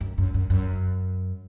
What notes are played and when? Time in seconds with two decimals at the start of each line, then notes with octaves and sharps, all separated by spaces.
0.01 F#2
0.18 F#2
0.34 F#2
0.50 F#2